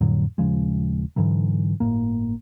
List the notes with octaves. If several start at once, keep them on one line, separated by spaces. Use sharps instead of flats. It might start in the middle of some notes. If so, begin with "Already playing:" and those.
F2 A2 D3 F#3
D#1 C#3 F3 G#3
G#2 D3 E3 F#3
G1 D#2 A2 A#3